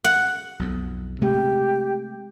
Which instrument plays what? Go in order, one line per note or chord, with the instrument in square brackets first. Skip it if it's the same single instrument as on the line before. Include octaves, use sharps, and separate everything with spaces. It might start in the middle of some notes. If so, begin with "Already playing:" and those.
[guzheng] F#5
[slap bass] B1 F2
[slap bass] C3 G#3 A3 [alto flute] G4